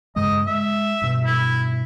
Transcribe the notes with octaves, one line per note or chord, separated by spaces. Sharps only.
G2 C#3 G#3 D#5
G#3 E5
G2 B2
E4